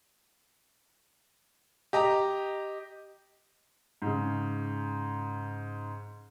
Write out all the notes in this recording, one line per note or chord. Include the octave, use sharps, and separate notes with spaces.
G4 D#5 A#5
G#2 C#3